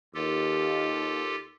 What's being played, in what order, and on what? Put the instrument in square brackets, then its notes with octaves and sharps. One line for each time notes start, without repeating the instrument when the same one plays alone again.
[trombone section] D#2 [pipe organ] F4 G4 A4